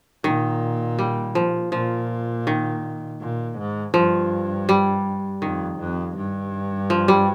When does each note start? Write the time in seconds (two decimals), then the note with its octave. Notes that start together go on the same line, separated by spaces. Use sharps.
0.24 A#2 D#3
0.99 G3
1.35 F3
1.72 A#2 F3
2.47 D#3
3.21 A#2
3.58 G#2
3.94 G2 F3
4.69 G3
5.42 F2 D#3
5.79 F2
6.17 G2
6.90 F3
7.08 G3